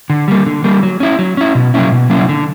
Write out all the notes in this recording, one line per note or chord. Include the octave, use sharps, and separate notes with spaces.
D3
G3 A#3
D3
G3 A#3
F#3
C#4 E4
F#3
C#4 E4
B2
F#3 A#3 C#4 E4
B2
F#3 A#3 C#4 E4
D3